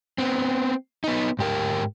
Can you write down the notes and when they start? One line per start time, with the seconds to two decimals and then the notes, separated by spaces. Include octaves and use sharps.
0.18 B3 C4
1.04 B3 D#4
1.39 G#2 G4 A#4